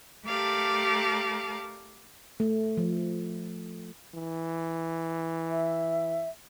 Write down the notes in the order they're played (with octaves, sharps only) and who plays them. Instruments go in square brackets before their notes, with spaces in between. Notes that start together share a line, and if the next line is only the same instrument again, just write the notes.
[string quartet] A3 G4 A#4 D5 F5 A5
[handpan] A3
F3
[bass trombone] E3
[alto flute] E5